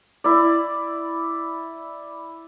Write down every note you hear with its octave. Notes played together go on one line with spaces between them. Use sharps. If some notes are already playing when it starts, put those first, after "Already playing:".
E4 D5